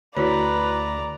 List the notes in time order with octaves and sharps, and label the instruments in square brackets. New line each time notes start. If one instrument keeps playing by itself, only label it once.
[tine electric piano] D2 B6 [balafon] E4 F#4 C#5 [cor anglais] B4 [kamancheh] D5 A#5